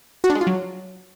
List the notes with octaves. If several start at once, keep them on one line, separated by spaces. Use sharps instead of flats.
F#4
D4
G#3
F4
F#3